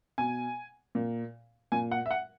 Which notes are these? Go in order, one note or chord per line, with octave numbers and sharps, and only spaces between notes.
B2 G#5
A#2
A#2 G#5
F#5
E5
F#5